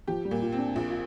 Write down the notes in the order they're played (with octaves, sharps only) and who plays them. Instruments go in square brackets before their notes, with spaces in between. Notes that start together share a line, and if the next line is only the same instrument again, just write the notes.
[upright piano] F3 [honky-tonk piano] G4
[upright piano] G3
[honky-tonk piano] A#2
[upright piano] F4
[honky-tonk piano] C4
[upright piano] D4
[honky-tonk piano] A#1 [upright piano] F4
[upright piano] F4